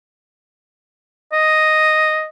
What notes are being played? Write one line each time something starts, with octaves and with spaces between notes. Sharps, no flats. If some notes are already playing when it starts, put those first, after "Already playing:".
D#5